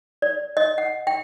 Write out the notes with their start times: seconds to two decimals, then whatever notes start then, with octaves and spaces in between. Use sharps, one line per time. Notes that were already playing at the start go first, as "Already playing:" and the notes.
0.22 D5
0.57 D#5
0.78 F#5
1.07 G5